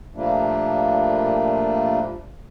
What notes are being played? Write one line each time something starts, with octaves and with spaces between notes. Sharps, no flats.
A#2 F3 G3 A3 A#3 D4